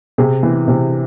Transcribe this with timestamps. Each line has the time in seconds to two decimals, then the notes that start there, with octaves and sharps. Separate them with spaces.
0.18 C3 G#4
0.43 E3
0.68 C3